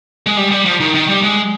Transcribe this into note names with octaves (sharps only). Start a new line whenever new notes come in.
G#3
G3
G3
F3
D#3
D#3
G3
G#3